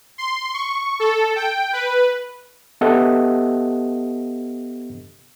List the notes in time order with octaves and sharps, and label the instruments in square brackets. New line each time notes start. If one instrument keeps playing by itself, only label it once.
[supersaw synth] C6
C#6
A4
G5
B4
[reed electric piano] B3 G4 A4 D#5 E5 F#5